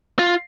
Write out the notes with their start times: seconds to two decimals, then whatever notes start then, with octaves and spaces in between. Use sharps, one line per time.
0.19 F4